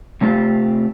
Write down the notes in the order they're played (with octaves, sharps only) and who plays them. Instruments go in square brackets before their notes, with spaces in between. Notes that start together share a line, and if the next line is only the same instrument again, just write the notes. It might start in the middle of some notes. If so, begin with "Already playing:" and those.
[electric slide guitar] C3 A3 C4 E4 F4 G4